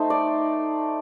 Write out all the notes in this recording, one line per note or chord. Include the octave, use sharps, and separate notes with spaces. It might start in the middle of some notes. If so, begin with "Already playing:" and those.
Already playing: A3 D#4 C5
D5